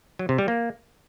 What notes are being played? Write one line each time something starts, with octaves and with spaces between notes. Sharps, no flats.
F#3
C3
G3
A#3